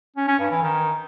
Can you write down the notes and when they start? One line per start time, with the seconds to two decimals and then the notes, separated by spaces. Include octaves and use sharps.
0.16 C#4
0.28 C#4
0.39 G2
0.51 E3
0.63 D#3